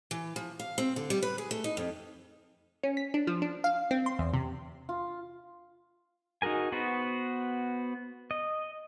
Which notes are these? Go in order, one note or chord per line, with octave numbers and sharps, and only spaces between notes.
E3
F3
F5
C4
D3
G3
B4
G#4
A3
D#4
F2
C#4
B6
D4
F3
D4
F5
C4
C6
E2
C3
F4
D#4 F#4 G#4 A#4 G#5
B3 F#4 B4 C5
D#5